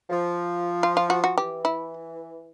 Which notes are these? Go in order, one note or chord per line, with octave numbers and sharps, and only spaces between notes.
F3
F4
F4
F#4
F#4
E3 G4
E4